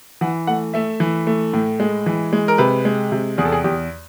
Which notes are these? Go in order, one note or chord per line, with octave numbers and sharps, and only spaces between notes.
E3 F#5
A3 F#5
A3 E5
E3
A3
A2
G#3
E3
G#3
A#4
C3 B4
G#3
C3
E2 G#4
A4
G#4
E2 G4